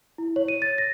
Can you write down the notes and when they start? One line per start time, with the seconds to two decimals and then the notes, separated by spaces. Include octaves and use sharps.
0.18 E4
0.36 C#5
0.48 D#7
0.62 A6
0.78 A#6